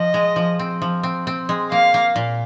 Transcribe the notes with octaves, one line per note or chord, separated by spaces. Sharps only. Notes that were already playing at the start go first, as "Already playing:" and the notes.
Already playing: F3 D#5
G#3
F3
C4
F3
C4
C4
G#3
A#3 F5
A#3
A#2